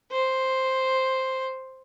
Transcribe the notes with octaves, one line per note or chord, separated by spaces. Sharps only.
C5